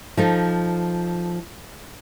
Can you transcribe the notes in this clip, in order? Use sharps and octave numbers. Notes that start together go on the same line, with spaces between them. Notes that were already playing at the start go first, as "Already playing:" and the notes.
F3 D#4 A4